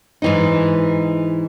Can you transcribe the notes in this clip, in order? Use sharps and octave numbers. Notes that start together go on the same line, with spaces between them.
G#2 E3 D#4